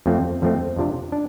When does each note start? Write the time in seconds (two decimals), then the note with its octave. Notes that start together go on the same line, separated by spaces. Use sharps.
0.06 F2 F3 A3 C4
0.42 F2 F3 A3 C4
0.76 F2 C3 F3 D4
1.12 D4